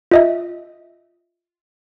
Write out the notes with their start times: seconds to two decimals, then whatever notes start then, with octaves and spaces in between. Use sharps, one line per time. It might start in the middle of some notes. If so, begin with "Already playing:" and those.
0.11 F4 D#5 E5